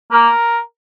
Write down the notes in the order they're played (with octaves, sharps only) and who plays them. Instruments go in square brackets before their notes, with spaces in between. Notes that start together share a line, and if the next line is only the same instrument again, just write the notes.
[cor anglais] A#3 [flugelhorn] A#4